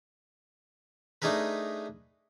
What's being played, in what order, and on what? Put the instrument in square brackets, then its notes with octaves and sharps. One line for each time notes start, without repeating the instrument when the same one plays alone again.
[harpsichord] A3 D4 D#4 G#4 A#4 B4